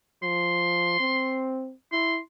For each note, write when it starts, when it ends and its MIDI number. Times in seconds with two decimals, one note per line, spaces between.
0.23 0.99 53
0.23 1.48 84
1.00 1.73 60
1.92 2.20 64
1.92 2.18 84